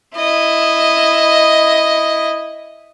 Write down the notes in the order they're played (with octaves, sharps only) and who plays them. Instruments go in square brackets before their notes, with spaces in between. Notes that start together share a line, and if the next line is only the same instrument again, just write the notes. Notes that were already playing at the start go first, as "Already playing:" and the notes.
[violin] E4 D#5